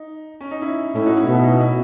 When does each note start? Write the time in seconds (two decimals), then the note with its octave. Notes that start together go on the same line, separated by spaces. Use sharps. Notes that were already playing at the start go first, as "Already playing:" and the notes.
Already playing: D#4
0.41 C#4
0.51 D#4
0.62 C#4 E4
0.95 A2 C#4 E4
1.06 D#4 F#4
1.16 C#4 E4
1.27 B2 D#4
1.36 E4
1.43 D#4
1.60 C#4 E4